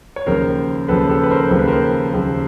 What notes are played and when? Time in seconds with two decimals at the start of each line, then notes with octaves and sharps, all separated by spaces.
0.16 C#5
0.26 D#2 C#3 F3 A#4 C5
0.88 D#2 C#3 F3 A4 B4
1.09 G4 A4
1.24 B4
1.30 A#4 C5
1.51 D#2 C#3 F3 C5
1.59 B4
1.67 A#4 C5
2.13 D#2 C#3 F3